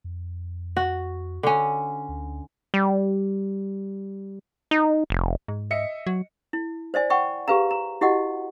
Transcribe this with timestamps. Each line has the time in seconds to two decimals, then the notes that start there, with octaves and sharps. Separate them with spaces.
0.04 F2
0.77 F#4
1.43 D3 C#4
2.09 D2
2.74 G3
4.71 D#4
5.10 F1
5.48 G#2
5.71 D#5 E5 C#7
6.07 F#3
6.53 E4
6.94 C5 D5 E5 G#5
7.10 E5 F#5 G5 B5 C#6
7.48 G4 G#4 B4 F5 A#5
7.71 A#5
8.01 E4 F#4 G4 D#5 F#5